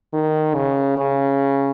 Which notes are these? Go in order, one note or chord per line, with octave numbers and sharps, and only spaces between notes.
D#3
C#3
C#3